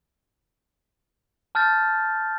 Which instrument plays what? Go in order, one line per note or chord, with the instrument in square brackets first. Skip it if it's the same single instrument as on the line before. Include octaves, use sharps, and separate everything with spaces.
[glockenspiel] A5 F6 G6 A6